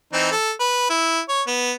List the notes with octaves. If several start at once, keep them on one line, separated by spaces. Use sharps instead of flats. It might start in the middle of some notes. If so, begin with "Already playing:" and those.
E3 C4 D#4
A4
B4
E4
C#5
B3